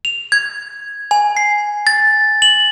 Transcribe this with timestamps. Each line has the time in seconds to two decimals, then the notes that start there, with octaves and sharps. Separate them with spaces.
0.05 F7
0.32 G#6
1.11 G#5
1.37 C7
1.87 A6
2.42 F#7